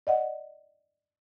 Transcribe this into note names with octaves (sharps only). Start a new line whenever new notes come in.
D5 D#5 F#5